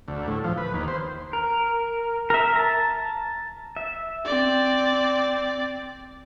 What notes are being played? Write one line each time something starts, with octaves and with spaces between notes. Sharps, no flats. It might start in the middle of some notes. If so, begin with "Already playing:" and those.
D2
A2
F3
B4
D#2
C5
A#4
A#4 E5
A5 A#5
E5
C4 D5